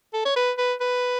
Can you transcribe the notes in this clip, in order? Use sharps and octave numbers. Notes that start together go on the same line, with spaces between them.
A4
C#5
B4
B4
B4